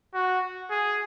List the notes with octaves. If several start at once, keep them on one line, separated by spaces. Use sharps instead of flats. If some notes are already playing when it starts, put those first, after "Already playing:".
F#4
G#4